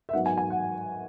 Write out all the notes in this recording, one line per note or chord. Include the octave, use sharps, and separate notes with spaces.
E5
G#2 F#3 B3 F#5
G#5
G#5
F#5